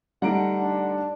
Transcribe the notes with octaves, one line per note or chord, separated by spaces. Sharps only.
D3 G3 A3 D#4 F#5 A#5 D7
D4